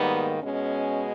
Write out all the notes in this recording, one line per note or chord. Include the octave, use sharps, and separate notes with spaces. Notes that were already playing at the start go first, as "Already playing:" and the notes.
Already playing: G#2 D#3 G3 A#3 B3
B2 G#3 C#4